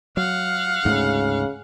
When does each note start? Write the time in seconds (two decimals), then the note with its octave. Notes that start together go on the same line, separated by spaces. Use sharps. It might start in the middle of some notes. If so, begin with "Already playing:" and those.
0.17 F#3 F5 F#5
0.85 D2 G#2 C#3 A3